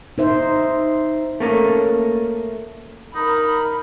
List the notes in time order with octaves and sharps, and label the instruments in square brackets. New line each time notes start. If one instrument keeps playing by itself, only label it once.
[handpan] D#4 C5 E5
[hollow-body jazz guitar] A3 A#3 C#4
[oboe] D#4 [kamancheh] A#4 B5